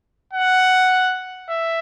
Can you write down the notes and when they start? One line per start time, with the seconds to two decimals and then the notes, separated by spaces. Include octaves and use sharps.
0.33 F#5
1.49 E5